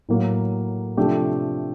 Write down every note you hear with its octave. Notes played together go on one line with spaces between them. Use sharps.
A2 F#3 A#3
C3 F3 A3 D4 G4